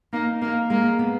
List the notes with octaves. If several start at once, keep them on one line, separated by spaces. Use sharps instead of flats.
A#3 D#4
A#3 A#4
G#3 A#3
B3